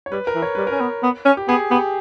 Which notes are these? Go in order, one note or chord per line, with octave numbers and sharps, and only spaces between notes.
C#5
G3 B4
A#4
E3
C#5
G3 B4
C#4 A#4
B3 B4
B3
C#4
G4
B3 G#4
B3 G4